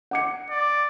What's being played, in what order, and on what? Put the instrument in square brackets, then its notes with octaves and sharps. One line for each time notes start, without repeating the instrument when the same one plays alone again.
[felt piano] F#5 D6 C#7
[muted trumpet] D5